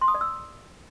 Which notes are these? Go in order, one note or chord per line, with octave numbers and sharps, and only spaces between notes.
C6
D#6
D5
E6